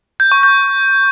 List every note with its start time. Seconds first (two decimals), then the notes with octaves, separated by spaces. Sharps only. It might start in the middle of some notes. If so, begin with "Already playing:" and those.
0.20 G6
0.32 C#6
0.43 G6